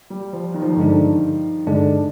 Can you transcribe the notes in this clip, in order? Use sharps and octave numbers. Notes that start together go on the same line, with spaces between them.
G3
F3
D#3
F3
D#3
G2 D3 G#3 D4
G2 D3 G#3 D4